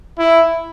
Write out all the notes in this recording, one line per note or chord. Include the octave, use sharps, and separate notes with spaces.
E4